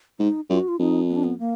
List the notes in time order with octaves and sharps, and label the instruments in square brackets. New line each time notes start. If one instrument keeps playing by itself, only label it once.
[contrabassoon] G#2 [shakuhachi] D#4
[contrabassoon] F#2 [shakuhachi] F4
[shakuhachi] F#4
F4
[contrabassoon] F2 [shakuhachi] D#4
[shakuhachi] B3
D4
B3
A#3